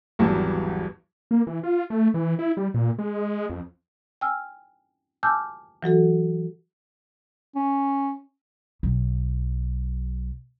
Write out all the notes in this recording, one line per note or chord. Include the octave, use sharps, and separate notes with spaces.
G#1 E2 F#3 G3 B3 A5
A#3
E3
F4
A3
E3
E4
G3
A#2
G#3
F2
G5 G#5 E6 F6
G#5 A5 D6 E6 F6 G6
E3 F#3 F#4 A4
C#4
B1 F#3